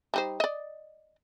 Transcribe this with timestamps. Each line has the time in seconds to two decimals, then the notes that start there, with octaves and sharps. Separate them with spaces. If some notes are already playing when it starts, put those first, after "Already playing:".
0.14 G3 D#4 C5
0.40 D5 D#5